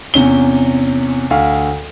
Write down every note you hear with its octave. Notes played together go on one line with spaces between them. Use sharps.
E2 C3 C#4 G7
D2 F5